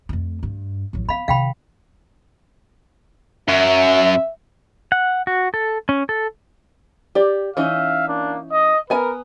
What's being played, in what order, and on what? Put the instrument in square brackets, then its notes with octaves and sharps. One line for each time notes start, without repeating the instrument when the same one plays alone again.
[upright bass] F2 A3
G2
A1 F#3
[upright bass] B3 [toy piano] F5 B5
[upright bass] C3 D#3 [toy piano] F5 G5 B5
[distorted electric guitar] F#2 [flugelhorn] E5
[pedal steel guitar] F#5
F#4
A4
C#4
A4
[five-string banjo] G4 D5
[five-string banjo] E3 C#4 D#4 [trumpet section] E5 F5
[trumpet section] A#3 D4
D#5
[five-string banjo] B3 G#5 A#5 [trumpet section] A#4 B4